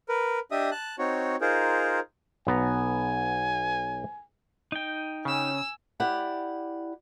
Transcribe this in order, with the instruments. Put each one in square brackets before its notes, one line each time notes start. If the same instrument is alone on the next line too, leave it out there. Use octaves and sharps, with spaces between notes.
[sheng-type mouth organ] A#4 B4
D4 G4 D#5 E5 D#6
A5 F#6
C4 D#4 F#4 C#5
D#4 F4 G#4 A#4 C5
[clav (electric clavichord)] B1 B3 A#5 [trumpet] G#5
[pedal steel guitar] D#4 G5
[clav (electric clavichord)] C#3 [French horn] C#4 [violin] G#5 E6
[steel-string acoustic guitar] E4 G4 D5 F#5